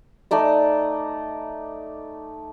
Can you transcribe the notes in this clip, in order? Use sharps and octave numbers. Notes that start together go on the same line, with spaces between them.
A3 D#4 D5 D#5